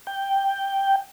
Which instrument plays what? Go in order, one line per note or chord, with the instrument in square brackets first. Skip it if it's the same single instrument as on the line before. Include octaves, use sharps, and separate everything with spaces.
[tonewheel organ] G5